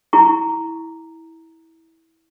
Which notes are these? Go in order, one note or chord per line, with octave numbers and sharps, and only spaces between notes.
E4 G#4 A#5 C#6